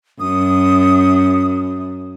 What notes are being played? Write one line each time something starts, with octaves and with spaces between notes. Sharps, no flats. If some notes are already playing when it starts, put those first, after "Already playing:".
F#2 D#6